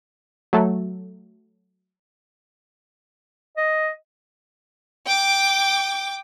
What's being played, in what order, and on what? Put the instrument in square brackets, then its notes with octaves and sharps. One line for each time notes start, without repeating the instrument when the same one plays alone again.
[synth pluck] F#3 A3 A4
[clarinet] D#5
[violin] G5 D6